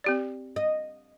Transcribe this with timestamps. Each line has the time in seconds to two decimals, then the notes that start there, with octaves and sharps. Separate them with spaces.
0.04 C4 G4 D5
0.56 D#5